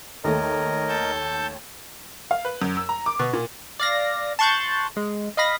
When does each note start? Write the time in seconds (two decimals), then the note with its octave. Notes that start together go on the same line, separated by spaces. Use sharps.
0.24 D#2 A3 A#4 C#5 D#5
0.88 A4 A5 G6
2.31 F5
2.45 B4
2.62 F#2
2.77 E6
2.89 A#5
3.06 D6
3.19 B2
3.33 A#2
3.79 D5 F5 A#6
4.39 A5 C6 C#6 F#6 G6 A6
4.97 G#3
5.37 D#5 F5 B5 A#6